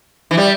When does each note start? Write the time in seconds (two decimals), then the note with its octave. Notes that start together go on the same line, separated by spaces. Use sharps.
0.31 E3
0.37 G3